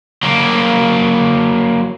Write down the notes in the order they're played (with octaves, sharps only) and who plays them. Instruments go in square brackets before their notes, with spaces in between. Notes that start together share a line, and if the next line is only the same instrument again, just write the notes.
[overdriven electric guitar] F#3 A#3